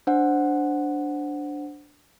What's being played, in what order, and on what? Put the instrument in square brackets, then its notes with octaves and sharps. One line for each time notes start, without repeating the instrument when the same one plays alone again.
[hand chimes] D4 C5 F#5